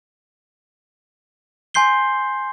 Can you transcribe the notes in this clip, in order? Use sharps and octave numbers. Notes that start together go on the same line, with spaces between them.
G#5 C6 G6 C7 G7